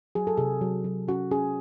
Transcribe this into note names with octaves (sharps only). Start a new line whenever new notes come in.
F#3 G#4
A4
C3 G#4
F#3
F#3
C#4 F#4
C#4 G#4